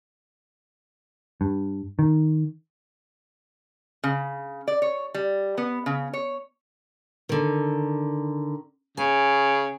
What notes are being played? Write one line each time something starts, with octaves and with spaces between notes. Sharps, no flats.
G2
D#3
C#3
D5
C#5
G3
B3
C#3
C#5
D3 D#3
C#3 G#5